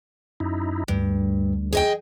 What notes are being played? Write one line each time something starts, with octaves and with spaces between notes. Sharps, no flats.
F#2 D#4 E4
D2 G2
G#4 D#5 G5